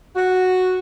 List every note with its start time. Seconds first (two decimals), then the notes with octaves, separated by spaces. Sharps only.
0.16 F#4